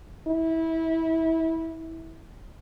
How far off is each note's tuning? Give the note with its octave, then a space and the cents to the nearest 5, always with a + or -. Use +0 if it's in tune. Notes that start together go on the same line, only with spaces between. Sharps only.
E4 -20